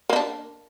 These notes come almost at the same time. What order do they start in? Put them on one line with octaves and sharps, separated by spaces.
A#3 D#4 D4